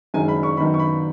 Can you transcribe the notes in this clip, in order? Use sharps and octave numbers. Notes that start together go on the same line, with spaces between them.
F#1 F#2 D#3 G#3 D#4 G#5
B5
C#6
F#2 D#3 B3 D#4 B5
C#6
B5